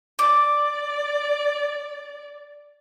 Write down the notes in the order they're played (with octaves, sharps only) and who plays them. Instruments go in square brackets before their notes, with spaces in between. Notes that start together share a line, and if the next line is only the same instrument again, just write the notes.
[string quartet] D5 [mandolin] D6